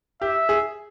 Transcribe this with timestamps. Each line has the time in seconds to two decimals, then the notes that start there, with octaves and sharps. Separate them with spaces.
0.21 G4 E5
0.49 G#4